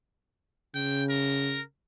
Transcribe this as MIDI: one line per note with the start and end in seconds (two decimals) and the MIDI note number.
0.75 1.62 49
0.75 1.03 79
1.10 1.61 70